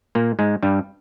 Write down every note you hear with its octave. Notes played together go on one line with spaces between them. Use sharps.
A#2 A#3
G#2 G#3
G2 G3